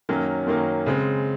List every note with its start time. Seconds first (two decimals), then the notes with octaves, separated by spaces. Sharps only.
0.09 F#2 D#3 F#3 A#3 C#4
0.47 F#2 D#3 F#3 A#3 C#4
0.86 C#3 G#3 C4